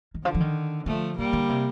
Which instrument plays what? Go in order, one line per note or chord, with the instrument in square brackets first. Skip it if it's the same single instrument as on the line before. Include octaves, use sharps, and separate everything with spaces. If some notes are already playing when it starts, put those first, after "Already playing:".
[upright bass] D#3
[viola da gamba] D3 [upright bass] F3
[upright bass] F3
D#3
[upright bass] D3 [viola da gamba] F3 A3
[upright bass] C3 [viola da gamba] G3 A#3
[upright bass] D3
C3